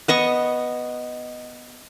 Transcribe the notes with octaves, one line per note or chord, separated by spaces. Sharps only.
B3 D#5 C#6